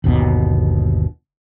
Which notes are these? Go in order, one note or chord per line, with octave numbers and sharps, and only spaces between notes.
G1 D#2 B2 B3